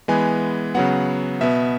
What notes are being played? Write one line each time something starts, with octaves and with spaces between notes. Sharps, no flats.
E3 G#3 B3 G#5
C#3 F#3 B3 F#5
B2 B3 E5